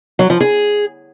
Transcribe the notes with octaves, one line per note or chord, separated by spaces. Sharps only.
F#3
F3
G#4